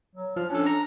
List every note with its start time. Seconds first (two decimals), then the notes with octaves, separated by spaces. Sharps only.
0.15 F#3
0.36 F3 F6
0.50 C#4 D4 A4
0.66 A#5